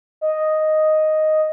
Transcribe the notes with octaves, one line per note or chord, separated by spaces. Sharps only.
D#5